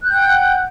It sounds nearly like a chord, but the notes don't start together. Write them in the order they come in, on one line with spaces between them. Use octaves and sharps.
F#6 G6 G5 F#5